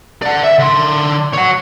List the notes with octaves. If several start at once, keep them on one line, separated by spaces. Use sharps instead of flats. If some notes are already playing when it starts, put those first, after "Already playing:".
D5 F#5
E5
D3 C6
C#5 F#5